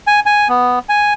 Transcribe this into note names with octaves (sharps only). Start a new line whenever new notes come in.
G#5
G#5
B3
G#5